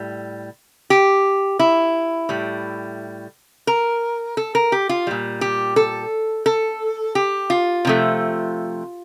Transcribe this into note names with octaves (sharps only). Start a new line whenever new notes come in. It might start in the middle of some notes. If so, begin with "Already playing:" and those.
Already playing: A2 G3
G4
E4
A2 G3
A#4
A4
A#4
G4
F4
A#2 G3
G4
A4
A4
G4
F4
C3 F3 A3